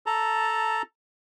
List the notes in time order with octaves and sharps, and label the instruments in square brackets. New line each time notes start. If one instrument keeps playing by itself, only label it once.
[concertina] A4 A5 A#5